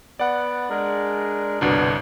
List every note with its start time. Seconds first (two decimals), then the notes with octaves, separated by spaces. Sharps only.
0.19 B3 D5 F#5
0.70 G#3 D4 A#4
1.61 G1 C2 B2 D4